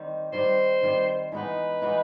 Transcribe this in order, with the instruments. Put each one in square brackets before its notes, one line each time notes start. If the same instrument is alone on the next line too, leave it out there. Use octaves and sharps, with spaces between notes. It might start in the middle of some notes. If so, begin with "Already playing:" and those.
Already playing: [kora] D#3 G3 C4
[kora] D#3 G3 C4 [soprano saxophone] C5
[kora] D#3 G3 C4
[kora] E3 G#3 B3 D#4 [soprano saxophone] B4
[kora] E3 G#3 B3 D#4